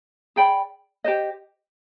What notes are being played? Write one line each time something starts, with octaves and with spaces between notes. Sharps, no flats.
G#4 D5 G5 B5
G4 C5 D#5